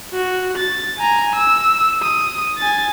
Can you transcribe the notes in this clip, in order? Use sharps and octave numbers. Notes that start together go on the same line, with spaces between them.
F#4
A6
G#5 A#5
E6
D#6
G#5 A6